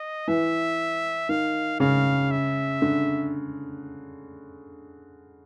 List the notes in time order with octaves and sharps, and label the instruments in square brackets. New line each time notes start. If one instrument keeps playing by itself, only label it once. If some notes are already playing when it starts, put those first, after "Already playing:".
Already playing: [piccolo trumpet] D#5
[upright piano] E3 [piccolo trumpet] E5
[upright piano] D#3 [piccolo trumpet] F5
[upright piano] C#3 [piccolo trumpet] F5
[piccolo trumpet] E5
[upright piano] D3